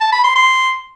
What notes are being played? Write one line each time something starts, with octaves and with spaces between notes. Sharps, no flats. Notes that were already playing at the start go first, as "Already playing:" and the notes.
A5
B5
C6
C6